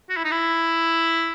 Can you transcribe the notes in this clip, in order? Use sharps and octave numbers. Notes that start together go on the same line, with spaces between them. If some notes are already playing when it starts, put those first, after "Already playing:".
F#4
E4
D#4
E4